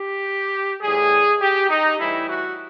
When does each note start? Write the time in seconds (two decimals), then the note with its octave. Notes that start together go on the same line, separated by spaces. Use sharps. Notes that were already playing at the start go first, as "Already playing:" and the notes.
Already playing: G4
0.81 A2 E3 G3 G#4
1.40 G4
1.69 D#4
1.99 A2 E3 G3 E4
2.28 F#4